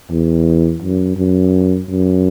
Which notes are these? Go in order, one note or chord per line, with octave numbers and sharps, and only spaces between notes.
E2
F#2
F#2
F#2